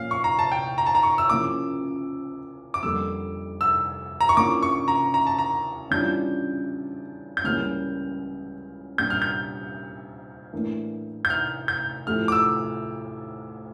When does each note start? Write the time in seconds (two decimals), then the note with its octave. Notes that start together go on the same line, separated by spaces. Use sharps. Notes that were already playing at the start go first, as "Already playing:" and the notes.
Already playing: A#2 F3 C#4 F5
0.11 C#6
0.24 A#5
0.39 A5
0.52 G5
0.78 A#5
0.87 A5
0.95 A#5
1.03 C#6
1.18 E6
1.29 C#3 F3 A#3 E4 D6
2.74 D6
2.83 F2 D3 G3 A#3 E6
3.61 E6
4.21 A#5
4.29 C#6
4.37 C#3 E3 A#3 D4 F4 D6
4.63 C#6
4.88 A#5
5.14 A#5
5.27 A5
5.39 A#5
5.91 C#3 E3 G3 D4 F4 G6
7.37 G6
7.44 C#2 C#3 E3 G3 A#3 F6
8.98 A#2 G3 D4 G4 G6
9.10 F6
9.22 G6
10.53 A2 E3 A#3 D4
11.25 G6
11.30 F6
11.68 G6
12.07 A2 F3 A3 E4 G4 F6
12.28 D6
12.32 E6